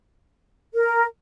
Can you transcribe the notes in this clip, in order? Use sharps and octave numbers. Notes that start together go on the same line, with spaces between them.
A#4